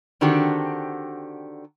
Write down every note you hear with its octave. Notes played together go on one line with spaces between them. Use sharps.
D3 D#3 C4 D4 F#4 G4